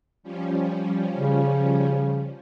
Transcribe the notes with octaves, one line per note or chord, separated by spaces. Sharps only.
F3 G3 C#4
C#3